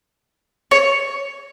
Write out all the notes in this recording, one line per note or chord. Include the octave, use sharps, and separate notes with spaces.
C#5